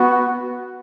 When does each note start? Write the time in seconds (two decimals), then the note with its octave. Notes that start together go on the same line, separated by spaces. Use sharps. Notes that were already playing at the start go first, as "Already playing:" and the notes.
Already playing: B3 F#4